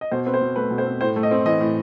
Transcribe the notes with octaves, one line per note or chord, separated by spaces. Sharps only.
D#5
B2 C5
C4 B4
C5
B2
A3 B4
B2
C5
C4
A2 C5
A3
D#5
C4
E3 D#5
A2